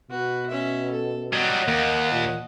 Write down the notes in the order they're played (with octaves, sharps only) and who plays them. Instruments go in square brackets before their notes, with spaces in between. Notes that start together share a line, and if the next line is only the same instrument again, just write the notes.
[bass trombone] B2 [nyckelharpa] F#4 B4
[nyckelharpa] C#4 E5
A4
[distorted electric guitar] F#3 G3 [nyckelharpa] D#5 F#5
[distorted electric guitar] D#2 [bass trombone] A#3
[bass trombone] A#2